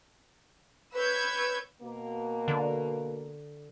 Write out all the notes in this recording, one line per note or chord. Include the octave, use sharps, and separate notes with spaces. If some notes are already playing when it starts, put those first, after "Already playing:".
B4 C#5 E6 G6 G#6
B2 A#3
D3